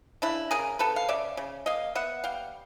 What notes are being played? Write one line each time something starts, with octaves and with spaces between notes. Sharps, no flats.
C#3 D4 E4
C#3 G#4 A#4
C#3 A4 B4
F5
C#3 D5 E5
C#3
A#3 D#5 F5
B3 E5 F#5
G3 F5 G5